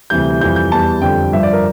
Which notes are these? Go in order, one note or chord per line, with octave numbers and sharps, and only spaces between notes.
D2 C3 E3 G3 G6
F2 E3 G3 G6
G6
E2 E3 G3 A5
F2 D3 G3 G5
G2 F3 E5
D5
A#4